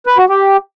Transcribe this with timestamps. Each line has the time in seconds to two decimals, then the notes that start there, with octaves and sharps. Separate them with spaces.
0.06 B4
0.18 F#4
0.29 G4